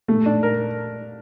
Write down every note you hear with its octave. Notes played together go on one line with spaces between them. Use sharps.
A3
D4
A#4